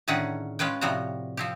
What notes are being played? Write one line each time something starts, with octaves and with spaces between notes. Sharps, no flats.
A2 D3 D#3 C#4 G#4 F#5
G#3 C#4 F4 B4 G5
A2 C3 F3 G3 F#4 A#5
F3 C4 G4